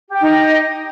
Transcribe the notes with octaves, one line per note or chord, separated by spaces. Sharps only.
D#4 G4 D#5 G5